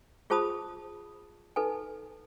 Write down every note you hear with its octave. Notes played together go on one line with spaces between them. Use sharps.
F4 G#4 C5 A5 B5 D#6
D#4 A4 B4 G#5